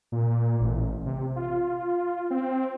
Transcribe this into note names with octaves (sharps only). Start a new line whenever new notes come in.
A#2
A1
C3
F4
C4